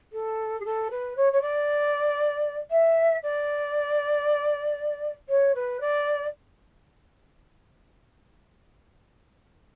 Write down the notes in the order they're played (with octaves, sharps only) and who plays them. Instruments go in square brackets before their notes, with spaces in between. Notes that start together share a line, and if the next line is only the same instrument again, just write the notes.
[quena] A4
G#4
A4
B4
C#5
C#5
D5
E5
D5
C#5
B4
D5